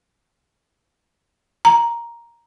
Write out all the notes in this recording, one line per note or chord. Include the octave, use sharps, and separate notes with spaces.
A#5